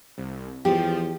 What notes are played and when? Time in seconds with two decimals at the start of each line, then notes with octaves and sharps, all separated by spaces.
0.18 C2
0.65 E2 F3 G4